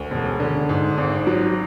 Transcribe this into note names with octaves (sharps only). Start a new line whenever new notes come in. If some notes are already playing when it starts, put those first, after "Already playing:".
Already playing: D2
E1
D3
G#2
G#1
F#3